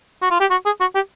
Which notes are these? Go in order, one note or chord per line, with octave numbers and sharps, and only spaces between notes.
F#4
F4
G4
F#4
G#4
F#4
G4